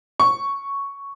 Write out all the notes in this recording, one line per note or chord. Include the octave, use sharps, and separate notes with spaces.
C#6